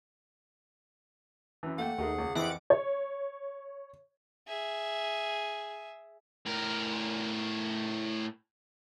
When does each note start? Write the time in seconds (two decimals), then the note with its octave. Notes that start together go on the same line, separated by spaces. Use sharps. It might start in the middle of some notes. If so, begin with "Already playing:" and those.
1.63 F#2 E3
1.78 A3 A#3 F#5 G5
1.98 D#2 A3 G#4 A#4
2.18 C#2
2.35 F2 E3 C4 E4 F#5 D6 D7
2.70 C#5
4.47 G#4 E5
6.46 A2 A#4